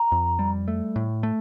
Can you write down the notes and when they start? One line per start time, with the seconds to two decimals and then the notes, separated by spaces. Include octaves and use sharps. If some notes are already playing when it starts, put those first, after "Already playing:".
Already playing: A#5
0.12 F2
0.39 G3
0.68 A3
0.96 A2
1.23 A3